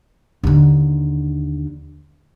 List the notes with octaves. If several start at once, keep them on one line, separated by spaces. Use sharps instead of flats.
D#2 D3